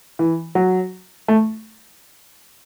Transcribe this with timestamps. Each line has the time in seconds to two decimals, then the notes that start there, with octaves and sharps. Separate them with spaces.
0.19 E3
0.55 F#3
1.28 A3